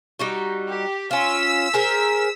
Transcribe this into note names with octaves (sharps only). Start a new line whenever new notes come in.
G3 D#4 F#4
G4
C#4 F4 E6 B6
G#4 A#4 C5